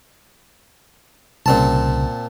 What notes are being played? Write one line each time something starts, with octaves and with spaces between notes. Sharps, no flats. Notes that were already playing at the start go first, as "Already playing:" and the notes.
C2 A#2 C#3 C4 A5